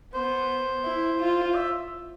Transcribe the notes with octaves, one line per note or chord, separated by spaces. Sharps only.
B3 C5
E4
F4
E5